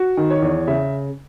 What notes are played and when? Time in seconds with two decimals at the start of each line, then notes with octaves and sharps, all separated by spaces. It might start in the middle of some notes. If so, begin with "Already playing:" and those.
Already playing: F#4
0.17 D#3
0.30 C#5
0.42 E2
0.67 C#3 E5